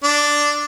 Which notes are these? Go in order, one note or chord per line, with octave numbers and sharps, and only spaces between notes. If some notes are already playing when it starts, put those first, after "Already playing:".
D4